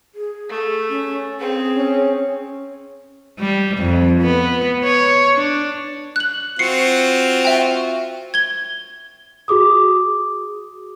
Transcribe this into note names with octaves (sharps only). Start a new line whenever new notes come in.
G#4
A3
C#4
C4 G#4
C#4
G3
F2
B3
C#5
D4
F#6 F#7
C4 F4 F#4 C7 C#7
E5 G5
G#6 G7
F#4 G#4 D6 D#6